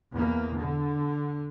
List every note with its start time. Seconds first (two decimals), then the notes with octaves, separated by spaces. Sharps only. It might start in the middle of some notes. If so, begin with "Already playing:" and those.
0.12 E2 A#3
0.56 D3